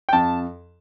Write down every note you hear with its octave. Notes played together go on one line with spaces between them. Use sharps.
G5
F2 A5